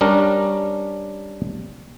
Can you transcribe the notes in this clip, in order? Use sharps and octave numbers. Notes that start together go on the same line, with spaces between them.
G3 C#4 D4 A#4